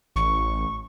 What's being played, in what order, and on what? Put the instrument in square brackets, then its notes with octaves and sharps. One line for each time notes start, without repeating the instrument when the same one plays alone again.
[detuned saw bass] A1 [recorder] C#6